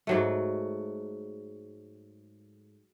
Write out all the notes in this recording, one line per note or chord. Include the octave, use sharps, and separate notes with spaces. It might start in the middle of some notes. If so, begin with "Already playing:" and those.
G#2 F#3 A3